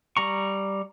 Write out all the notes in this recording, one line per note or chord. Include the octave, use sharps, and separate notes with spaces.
G3 A#5 C#6